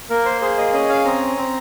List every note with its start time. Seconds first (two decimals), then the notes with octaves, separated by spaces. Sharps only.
0.10 A#3 A#4
0.25 C5
0.41 G#4 C5
0.57 D#5
0.73 C#4 D#5
0.89 F5
1.05 C4 A#5
1.37 C4